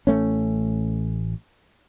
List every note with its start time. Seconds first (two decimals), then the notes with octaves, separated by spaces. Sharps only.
0.07 A1 A3 C#4